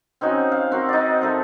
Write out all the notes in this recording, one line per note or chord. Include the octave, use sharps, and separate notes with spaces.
C4 C#4 D#4 F#4
F5
C4 F#4 A#4
D#4 D5
C4 A4 E5